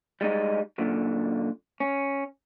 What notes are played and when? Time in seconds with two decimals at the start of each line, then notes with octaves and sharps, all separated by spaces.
0.21 G3 G#3 D#4
0.78 F#2 A#2 D3
1.80 C#4